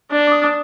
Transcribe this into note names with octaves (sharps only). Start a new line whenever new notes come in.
D4
D6
D#6